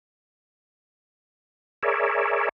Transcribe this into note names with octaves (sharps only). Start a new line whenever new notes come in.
G#4 A#4 C#5 D5 E5